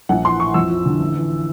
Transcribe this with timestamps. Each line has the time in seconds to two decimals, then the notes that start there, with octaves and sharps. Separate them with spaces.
0.09 A#1 F#5
0.24 E3 C6
0.40 A2 C#6
0.54 F2 E6
0.70 F3
0.86 D3
1.00 A1
1.16 E3